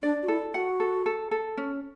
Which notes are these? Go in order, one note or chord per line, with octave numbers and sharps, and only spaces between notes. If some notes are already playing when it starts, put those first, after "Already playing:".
D4 D5
F#4
E4 A4
F#4 F#5
A4
A4
A4
C#4